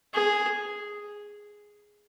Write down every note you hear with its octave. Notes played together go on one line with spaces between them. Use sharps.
G#4